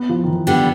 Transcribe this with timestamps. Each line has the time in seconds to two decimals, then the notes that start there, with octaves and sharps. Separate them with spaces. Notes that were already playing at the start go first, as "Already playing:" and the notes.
Already playing: B3
0.09 F3
0.23 D#3
0.28 E3
0.47 D3 G3 B3